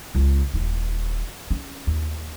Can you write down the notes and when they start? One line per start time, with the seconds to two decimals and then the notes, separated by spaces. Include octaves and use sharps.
0.15 C#2 C#4
0.53 D#1 E4
1.50 C#4
1.87 D#2